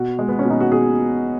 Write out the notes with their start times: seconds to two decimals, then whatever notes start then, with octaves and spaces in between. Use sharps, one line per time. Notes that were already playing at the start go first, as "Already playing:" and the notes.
Already playing: B2 F#4
0.19 G#3
0.29 B3
0.39 C#4
0.45 B2
0.50 D#4
0.60 F#4
0.72 B2 G#4